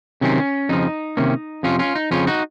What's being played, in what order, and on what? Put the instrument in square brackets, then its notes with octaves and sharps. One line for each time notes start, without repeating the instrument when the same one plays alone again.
[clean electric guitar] C3 D#3 F#3 C4 C#4
F2 C#3 F3 D#4
C3 D#3 A#3 C#4
F2 C3 F3 C#4 F4
C#4 F4
D#4
F2 C#3 F3 C#4 F4
D#4 F#4